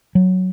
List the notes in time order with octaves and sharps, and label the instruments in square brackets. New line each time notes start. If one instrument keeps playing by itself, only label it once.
[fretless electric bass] F#3